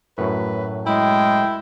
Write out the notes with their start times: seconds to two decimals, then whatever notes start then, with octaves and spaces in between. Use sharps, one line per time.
0.18 F#2 A2 B4
0.86 G#3 E4 G5